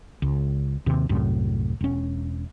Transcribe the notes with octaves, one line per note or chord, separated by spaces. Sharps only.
C#2
D#2 C3
C2 F#2 A2
E1 C#4